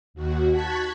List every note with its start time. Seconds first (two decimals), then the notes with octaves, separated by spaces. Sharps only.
0.14 D#2 F#4
0.51 A5 C#6 F#6 G#6 B6